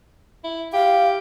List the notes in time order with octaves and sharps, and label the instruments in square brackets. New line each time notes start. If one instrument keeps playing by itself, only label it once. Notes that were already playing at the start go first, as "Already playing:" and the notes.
[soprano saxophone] E4
[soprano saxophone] G4 [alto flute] F5